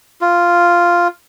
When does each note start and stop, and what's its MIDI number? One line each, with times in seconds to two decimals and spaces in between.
0.21 1.08 65